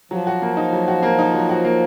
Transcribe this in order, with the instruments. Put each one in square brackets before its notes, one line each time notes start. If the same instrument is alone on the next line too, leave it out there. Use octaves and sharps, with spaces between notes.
[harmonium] F3 [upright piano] F#3
[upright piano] F#4
A#3
D#4
F#3
F#4
A#3
D#4
F#3
F#4
A#3